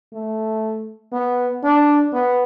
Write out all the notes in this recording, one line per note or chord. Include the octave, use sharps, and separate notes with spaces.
A3
B3
D4
B3